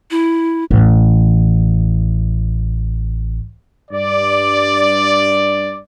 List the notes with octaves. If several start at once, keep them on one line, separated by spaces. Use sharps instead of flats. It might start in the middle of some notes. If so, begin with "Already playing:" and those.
E4
A1 E2
G2 D5